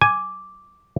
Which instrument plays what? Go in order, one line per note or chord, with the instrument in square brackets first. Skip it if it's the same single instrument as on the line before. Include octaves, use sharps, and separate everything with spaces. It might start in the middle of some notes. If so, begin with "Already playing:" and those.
[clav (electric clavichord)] G#5 [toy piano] D6